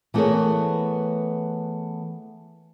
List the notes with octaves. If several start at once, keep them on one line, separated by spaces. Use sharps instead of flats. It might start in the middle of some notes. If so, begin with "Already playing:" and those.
E3 A3 B3 G#4 A#4 C#5